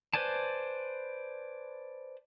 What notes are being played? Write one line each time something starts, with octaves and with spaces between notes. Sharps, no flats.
B4 C5 D5 G#5 A5